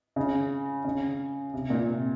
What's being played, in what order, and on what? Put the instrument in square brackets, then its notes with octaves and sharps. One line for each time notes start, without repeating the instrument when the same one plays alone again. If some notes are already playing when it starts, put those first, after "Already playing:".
[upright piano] C#3
C#3
C3
A#2
C3